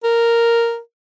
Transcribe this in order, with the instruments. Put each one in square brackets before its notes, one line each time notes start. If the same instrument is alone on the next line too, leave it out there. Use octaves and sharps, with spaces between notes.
[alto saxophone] A#4